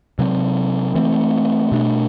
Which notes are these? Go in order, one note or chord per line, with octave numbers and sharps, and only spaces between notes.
C3 F#3 C4
E3 A3 C4
B2 A3 D4